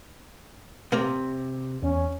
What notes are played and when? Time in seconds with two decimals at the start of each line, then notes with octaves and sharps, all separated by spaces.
0.92 C3 A#3 A#4 A#5
1.83 E2 C#4